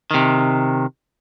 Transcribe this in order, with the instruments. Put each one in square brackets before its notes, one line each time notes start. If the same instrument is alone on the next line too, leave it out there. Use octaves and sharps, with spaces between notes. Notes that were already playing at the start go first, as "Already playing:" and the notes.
[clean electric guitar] C3 D#3